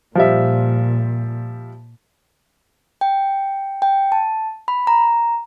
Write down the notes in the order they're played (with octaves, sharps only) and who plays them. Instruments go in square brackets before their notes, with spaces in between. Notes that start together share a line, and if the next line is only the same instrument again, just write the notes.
[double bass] A#2 [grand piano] F3 G3 E5
[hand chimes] G5
G5
A5
B5
A#5